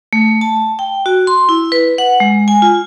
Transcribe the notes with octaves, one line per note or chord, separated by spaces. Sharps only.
A3
A5
G5
F#4
C6
E4
B4
F#5
G#3
G#5
F4